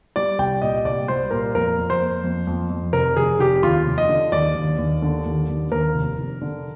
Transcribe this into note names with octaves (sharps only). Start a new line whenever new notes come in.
G3 D5
C2 G5
A#2 D#5
C2 D5
G3 C5
A#2 A#4
F2 A#4
F2
C5
A#3
F2
F2
F2
F1 A#4
F1 G#4
F1 G4
D#2 F4
F1
D#5
D3
D#2 D5
D#2
D#2
D3
D#2
D#2
D#2 A#4
F1
F1
D3